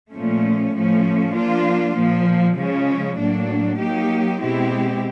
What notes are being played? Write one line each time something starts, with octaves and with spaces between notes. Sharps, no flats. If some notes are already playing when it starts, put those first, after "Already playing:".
A#2 F3 A3 C#4
A2 F3 A3 C#4
F3 A#3 D4 F4
A#2 F3 A#3
C#3 F3 G#3 C#4
A2 F#3 A#3 D4
F#3 A#3 D#4 G4
B2 G#3 C4 E4 G4